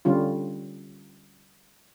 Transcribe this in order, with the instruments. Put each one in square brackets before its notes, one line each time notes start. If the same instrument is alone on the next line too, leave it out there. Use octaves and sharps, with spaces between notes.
[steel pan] D3 G3 C#4 F4